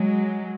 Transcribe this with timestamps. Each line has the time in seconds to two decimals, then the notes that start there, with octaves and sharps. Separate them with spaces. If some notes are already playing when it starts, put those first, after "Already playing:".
Already playing: F#3 G#3